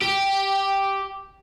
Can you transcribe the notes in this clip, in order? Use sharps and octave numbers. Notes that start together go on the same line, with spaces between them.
G4